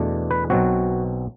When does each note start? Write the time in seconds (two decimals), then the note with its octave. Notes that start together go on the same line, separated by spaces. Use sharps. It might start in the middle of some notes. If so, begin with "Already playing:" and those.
Already playing: E2 B2 A3 D4
0.31 B4
0.50 B1 B2 F#3 C4 F#4